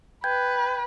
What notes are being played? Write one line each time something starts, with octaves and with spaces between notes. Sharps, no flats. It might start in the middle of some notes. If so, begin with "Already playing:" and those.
B4 G5 G6 G#6